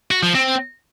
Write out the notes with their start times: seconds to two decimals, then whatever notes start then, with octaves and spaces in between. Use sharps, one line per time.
0.11 F#4
0.23 F3
0.35 C4